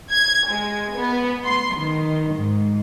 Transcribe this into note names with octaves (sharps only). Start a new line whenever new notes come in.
G#6
G#3
B3
C6
D#3
G#2